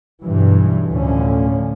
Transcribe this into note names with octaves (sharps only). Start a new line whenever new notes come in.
B1 G2 E3
D2 A2 D3 F3 C#4